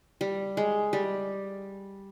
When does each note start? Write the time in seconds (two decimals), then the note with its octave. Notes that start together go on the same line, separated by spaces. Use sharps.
0.21 G3
0.57 G#3
0.93 G3